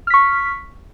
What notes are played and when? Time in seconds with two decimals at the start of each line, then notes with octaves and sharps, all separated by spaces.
0.07 F6
0.10 B6
0.14 C#6